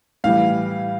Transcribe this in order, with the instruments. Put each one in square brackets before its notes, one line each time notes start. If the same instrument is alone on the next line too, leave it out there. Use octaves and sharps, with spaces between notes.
[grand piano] A2 E3 G3 F5